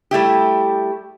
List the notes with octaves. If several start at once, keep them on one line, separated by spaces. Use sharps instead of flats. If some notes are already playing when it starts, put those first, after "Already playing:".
G3 A3 E4 G4